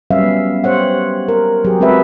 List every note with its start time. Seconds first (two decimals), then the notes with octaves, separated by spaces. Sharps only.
0.11 F#3 G3 C#4 B4 E5 F5
0.23 B3
0.64 G4 C5 C#5 F#5
1.28 A#4
1.64 F#3 G4 G#4
1.80 G#3 C4 F#4 G#4 B4 E5